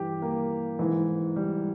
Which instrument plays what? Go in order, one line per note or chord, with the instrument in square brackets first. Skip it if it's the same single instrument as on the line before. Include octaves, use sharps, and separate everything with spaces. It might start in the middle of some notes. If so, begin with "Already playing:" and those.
Already playing: [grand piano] G2 E3 G4
A#3
G#2 E3
G3